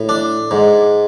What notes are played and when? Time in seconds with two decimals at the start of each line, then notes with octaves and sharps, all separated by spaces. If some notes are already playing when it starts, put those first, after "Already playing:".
Already playing: A2
0.09 D4
0.51 G#2